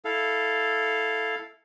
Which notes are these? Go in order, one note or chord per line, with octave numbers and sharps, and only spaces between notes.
E4 A4 F5